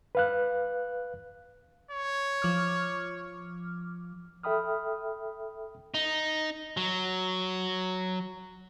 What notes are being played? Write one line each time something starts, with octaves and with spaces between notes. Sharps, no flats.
B4 F5 F#6
C#5
F3 D6 F6
A4 E5 G5 B5 D#6 F6
D#4
F#3